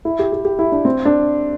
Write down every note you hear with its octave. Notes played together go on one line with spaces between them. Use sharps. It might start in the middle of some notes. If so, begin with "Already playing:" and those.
E4
G4
G4
G4
E4
D4
C4
D4